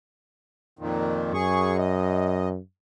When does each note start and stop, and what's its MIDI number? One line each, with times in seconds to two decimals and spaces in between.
0.79 1.33 41
0.79 1.33 46
0.79 1.33 51
1.34 2.59 42
1.34 1.77 68
1.34 1.77 85
1.78 2.49 75